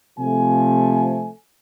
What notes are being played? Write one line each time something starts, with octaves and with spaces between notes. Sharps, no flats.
C3 F3 A3 G#5